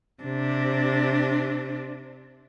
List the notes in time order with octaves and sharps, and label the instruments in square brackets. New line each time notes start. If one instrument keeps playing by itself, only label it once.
[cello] C3 D4